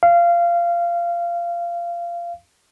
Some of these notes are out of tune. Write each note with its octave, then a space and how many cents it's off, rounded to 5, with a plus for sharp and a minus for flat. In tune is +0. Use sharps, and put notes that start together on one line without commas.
F5 -20